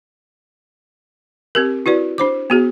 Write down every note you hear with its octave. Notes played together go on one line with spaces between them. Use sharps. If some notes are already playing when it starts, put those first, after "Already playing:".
C4 G4 A#4
E4 F#4 B4 D5
D4 C5 D6
B3 F#4 G#4